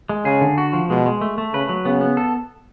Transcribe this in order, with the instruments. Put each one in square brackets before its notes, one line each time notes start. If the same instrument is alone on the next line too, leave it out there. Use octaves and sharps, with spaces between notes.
[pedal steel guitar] G#3
[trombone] C#3 [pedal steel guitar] G#4
[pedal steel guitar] D3
F#4
F3
[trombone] B2 [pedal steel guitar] G#3
[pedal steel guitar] G#3
A3
A3
[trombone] C#3 [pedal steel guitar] B4
[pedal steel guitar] F#3
[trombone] C#3 [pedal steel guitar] B3
[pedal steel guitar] B3
A4